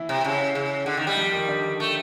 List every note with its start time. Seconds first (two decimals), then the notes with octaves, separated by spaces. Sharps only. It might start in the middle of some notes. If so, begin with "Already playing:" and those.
Already playing: E3 E4
0.09 C3
0.25 C#3
0.55 C#3
0.86 D3
0.97 D#3
1.07 G3
1.17 F3 F4
1.32 D#3 D#4
1.48 D3 D4
1.80 A3